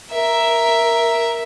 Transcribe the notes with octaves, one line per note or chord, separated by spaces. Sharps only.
A#4 E5